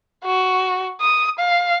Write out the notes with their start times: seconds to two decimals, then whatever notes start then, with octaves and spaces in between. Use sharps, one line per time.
0.25 F#4
1.01 D#6
1.39 F5